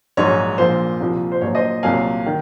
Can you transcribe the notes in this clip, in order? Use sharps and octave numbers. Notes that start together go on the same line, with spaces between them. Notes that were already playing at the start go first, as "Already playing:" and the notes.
A#1 G#2 F#3 C#5
A#1 A#2 F3 C5
C2 A#2 F3
C5
A#1 A#2 F#3 C#5
C5 D#5
C2 A#2 F#3 F5 G#5
D#3